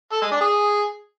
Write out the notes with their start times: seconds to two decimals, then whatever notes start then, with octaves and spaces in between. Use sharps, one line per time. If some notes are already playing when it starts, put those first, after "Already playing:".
0.12 A4
0.22 G#3
0.31 D4
0.41 G#4